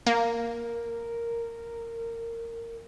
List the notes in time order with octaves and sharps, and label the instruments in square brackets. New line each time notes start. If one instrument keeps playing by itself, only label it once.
[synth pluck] A#3 [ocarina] A#4